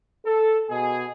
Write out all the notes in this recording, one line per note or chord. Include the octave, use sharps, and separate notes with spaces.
A4
B2 G#4